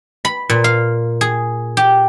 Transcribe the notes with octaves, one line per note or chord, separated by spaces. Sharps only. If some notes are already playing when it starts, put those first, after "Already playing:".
B5
A#2
F5
G#4
G4